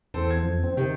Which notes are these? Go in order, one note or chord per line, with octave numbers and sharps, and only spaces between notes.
E2 C4 A4 C5
G#6
F2
C4
C3 D#3